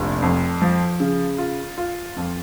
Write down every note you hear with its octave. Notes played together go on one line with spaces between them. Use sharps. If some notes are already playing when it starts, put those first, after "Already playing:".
Already playing: F1 A#1
F2
F3
C#3
F4
F4
F2